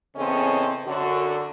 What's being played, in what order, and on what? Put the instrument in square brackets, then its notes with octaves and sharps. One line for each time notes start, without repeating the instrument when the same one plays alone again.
[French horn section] E2 C#3 C4 C#4 A4 D#5
F#2 D3 F#4